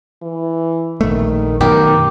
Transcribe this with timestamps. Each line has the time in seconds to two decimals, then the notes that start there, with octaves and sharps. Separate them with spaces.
0.22 E3
1.01 A#1 D#3 A3
1.61 F#2 B2 D#3 G4 A#4